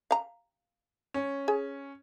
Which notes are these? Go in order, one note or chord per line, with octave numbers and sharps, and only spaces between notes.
F5 A#5
C#4
G#4